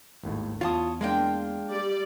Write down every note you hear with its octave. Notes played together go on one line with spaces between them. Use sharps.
G#1 D#2 A2
E2 F4 C#5 A5 D#6
G#3 A#3 D4 F4 F5 G5
G3 D5